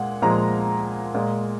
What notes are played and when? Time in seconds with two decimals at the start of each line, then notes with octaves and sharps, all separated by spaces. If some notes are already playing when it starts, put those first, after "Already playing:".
Already playing: A#2 G#3 F#5
0.22 A#2 F3 G#3 A#5
1.14 A#2 G#3